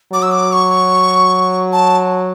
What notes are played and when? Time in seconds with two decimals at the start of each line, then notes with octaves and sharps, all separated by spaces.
0.13 F#3 D6
0.22 E6
0.32 D6
0.52 C#6
1.72 A5